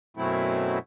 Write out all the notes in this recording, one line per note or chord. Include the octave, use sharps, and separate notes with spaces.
F#2 B2 F#3 A3 C4 E4